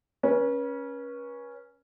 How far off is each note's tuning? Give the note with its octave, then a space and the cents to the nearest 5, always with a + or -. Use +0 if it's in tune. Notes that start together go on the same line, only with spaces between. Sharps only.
C#4 +0 B4 -40